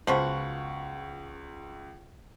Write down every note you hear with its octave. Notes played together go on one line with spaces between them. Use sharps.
C#2 F3 B3 F#4 C#6